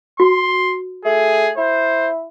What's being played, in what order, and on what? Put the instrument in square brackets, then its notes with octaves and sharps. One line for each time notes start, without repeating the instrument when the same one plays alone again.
[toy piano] F#4 [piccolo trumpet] C6
[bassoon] A3 [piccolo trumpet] G#4
[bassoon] E4 [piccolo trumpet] C5